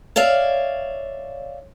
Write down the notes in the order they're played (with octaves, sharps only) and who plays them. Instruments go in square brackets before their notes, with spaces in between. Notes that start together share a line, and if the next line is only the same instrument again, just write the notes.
[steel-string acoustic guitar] C#5 D5 E5 F5